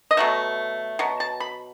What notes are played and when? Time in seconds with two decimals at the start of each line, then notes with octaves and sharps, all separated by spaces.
0.11 D#5
0.17 B2 F#3 A3 E5
0.99 B2 F#3
1.20 A5
1.40 B5